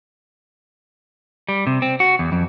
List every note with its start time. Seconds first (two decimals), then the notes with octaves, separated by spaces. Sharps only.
1.49 G3
1.67 C3
1.82 C4
2.00 F#4
2.19 E2
2.32 F2